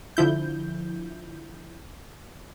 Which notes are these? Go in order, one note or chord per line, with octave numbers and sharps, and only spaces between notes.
D3 F3 E4 G6